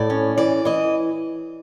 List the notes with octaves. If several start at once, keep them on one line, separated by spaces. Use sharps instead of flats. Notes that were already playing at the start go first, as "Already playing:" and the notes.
Already playing: A2 D5
C#4
E3 D5
E3 D#5